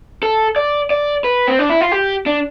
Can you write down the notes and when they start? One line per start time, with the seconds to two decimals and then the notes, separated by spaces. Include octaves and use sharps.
0.23 A4
0.56 D5
0.90 D5
1.24 B4
1.47 C4
1.59 D4
1.70 E4
1.81 F4
1.92 G4
2.26 D4